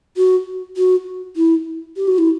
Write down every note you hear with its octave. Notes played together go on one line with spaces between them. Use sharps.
F#4
F#4
E4
G4
F#4
E4